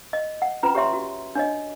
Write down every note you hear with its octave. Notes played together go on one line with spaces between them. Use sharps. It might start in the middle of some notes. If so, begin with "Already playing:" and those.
D#5
F#5
C#4 F4 B4 A#5
G4 C#5 E5 C6
F#4
D4 C#5 D#5